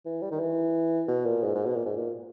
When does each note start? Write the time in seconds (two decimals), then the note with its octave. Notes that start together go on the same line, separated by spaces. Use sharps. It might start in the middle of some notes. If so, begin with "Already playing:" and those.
0.06 E3
0.22 G3
0.31 D#3
0.40 E3
1.08 B2
1.26 A#2
1.43 G#2
1.55 G#2
1.66 B2
1.76 A#2
1.85 G#2
1.96 A#2